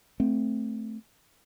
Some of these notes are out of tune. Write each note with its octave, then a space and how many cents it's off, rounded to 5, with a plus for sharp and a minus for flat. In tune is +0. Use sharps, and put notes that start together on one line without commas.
A3 +0 C4 +0